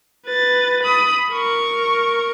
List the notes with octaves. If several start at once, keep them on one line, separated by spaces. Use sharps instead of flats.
B4 A6
B5 D#6
A#4 C#6